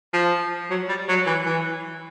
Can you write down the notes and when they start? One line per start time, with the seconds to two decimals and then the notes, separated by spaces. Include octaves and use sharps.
0.13 F3
0.70 F#3
0.89 G3
1.08 F#3
1.27 E3
1.46 E3